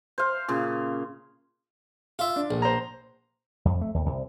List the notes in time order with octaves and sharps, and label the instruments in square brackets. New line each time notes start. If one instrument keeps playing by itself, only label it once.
[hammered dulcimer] C5 F5
A#2 C#3
[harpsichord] F4 E5
[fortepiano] D4
[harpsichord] A#1
[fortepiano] C5 A#5
[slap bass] F2
A3
D#2
C2